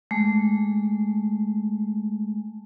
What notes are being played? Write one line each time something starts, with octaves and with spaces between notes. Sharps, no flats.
G#3 A3